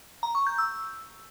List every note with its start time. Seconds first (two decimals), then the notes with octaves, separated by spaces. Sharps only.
0.23 A#5
0.35 C#6
0.47 G6
0.58 E6